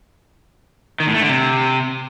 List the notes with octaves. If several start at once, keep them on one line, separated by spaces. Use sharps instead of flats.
D#3
A2
A3
D3
C3